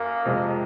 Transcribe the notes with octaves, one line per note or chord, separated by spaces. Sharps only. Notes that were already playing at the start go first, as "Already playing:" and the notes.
Already playing: F#2 A#3
F2 C3 F3 G#3